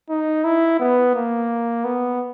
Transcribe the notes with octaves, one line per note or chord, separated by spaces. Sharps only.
D#4
E4
B3
A#3
B3